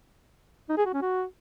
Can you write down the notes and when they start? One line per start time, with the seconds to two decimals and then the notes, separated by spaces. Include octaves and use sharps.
0.69 D#4
0.77 G#4
0.86 F#4
0.94 C#4
1.02 F#4